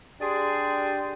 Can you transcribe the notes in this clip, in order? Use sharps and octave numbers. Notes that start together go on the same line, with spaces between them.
D4 G4 G#4 D5 G5 C6